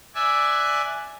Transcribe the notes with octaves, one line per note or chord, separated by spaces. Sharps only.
D5 E5 G#5 E6 F#6